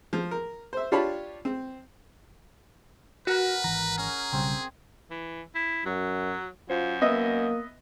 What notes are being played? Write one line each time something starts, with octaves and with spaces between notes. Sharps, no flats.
F3
A#4
C5 E5
D4 F4 G4 C#5 A5 B5
C4
F#4 A#4 B4 F#5
G#1 E3 A#5
C#4 G#4
B1 C#3 G3 C4
E3
E4
F#2 F#3
F#2 F4 C5
A#3 B3 D#5 E5